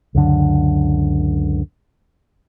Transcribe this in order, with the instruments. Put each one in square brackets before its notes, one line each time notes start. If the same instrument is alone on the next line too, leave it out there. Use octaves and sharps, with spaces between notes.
[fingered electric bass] C#2 F#2 D3